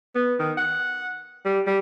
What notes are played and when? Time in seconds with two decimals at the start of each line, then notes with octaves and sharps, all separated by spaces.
0.15 B3
0.39 D#3
0.57 F#5
1.45 G3
1.67 G3